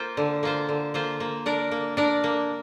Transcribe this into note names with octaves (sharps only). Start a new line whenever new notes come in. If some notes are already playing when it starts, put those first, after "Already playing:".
Already playing: A#3 F4 C5
D3
A#3 F4 C5
D3
A#3 F4 C5
A#3
D4 A#4 D5
A#3
D4 A#4 D5
A#3